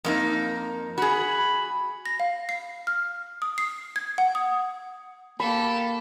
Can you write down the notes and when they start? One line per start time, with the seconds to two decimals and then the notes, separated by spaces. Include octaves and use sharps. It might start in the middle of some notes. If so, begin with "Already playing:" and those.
0.04 F2 A#3 D#4
0.98 F#4 G#4 B5
2.06 A#6
2.20 F5
2.49 C7
2.87 F6
3.42 D#6
3.58 C7
3.96 G#6
4.18 F#5
4.35 D#6
5.40 A#3 G4 A4 B5